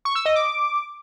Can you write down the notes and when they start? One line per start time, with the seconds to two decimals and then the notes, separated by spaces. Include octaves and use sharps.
0.05 C#6
0.15 E6
0.26 D#5
0.36 D6